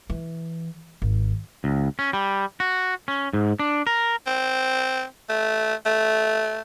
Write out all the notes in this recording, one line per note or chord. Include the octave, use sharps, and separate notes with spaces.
E3
G#1
C#2
C#4
G3
F#4
C#4
G#2
D4
A#4
C4
A3
A3